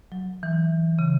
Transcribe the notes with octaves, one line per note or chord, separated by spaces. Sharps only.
F#3
E3
C#3